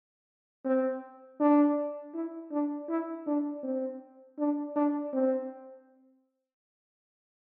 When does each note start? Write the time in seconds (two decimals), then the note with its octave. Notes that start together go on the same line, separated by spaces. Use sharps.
0.65 C4
1.40 D4
2.14 E4
2.52 D4
2.89 E4
3.27 D4
3.63 C4
4.39 D4
4.76 D4
5.13 C4